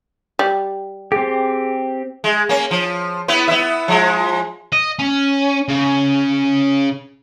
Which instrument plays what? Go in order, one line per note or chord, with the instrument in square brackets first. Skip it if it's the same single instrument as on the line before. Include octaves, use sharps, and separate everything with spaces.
[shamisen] G3
[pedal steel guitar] C4 G4 [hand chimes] G#4
[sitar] G#3
A#3 C#4
F3
B3 E4 B4
B3 E4 E5
F3 G#3
[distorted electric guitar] D#5
C#4
C#3